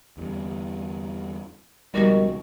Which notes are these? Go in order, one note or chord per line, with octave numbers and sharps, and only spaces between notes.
E2 G2 D3
C#2 B2 D#3 F3 G3 F#4